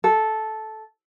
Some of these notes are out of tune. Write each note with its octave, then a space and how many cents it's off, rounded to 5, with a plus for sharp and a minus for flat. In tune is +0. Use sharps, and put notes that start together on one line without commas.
A4 -10